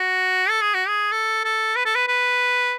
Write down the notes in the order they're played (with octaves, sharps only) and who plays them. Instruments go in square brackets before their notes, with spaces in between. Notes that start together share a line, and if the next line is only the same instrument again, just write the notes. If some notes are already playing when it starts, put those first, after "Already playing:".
Already playing: [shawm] F#4
A4
G#4
F#4
G#4
A4
A4
B4
A4
B4
B4